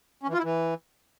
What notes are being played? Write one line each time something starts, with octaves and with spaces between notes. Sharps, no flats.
C#4
E3
F4
E4
E3